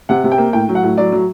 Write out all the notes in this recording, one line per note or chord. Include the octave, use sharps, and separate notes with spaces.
C3 F#5
C3
G5
A#3
A2 G5
F#3
F#5
A2
F#3 D5
F#3